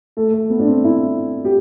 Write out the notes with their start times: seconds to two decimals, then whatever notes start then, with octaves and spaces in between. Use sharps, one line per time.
0.17 A3
0.33 A3
0.50 B3
0.59 D4
0.67 C4
0.84 E4
1.45 G4